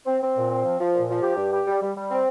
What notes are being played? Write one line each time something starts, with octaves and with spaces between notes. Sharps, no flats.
C4
C4
A#2
C4
F3
F3
A#2
F3
G4
G2
G4
G3
G3
G3
C4